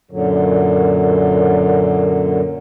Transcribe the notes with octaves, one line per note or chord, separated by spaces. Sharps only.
F#2 A#2 D3 F#3